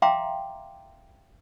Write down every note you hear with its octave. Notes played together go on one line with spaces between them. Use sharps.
E5 F5 G5 A#5 C6 D6